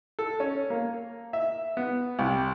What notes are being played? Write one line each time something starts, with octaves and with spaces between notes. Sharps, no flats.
A4
C#4
A#3
E5
B3
C2